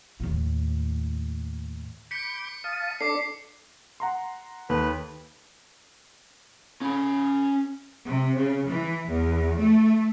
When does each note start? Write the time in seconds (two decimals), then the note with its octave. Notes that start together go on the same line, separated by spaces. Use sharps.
0.20 D#2 A2
2.11 B5 D6 G6 B6 C#7
2.64 F5 A5 D#6
3.01 D4 A4 D6 B6 C7
4.00 F#5 A#5 C6
4.69 D#2 A4 B4
6.81 C#4 B5
8.07 C3
8.38 C#3
8.68 E3
9.11 E2
9.59 A3